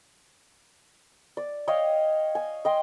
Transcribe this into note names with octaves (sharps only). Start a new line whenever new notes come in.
D5
C#5 D#5 F5 G5
G#5
D#5 G5 C6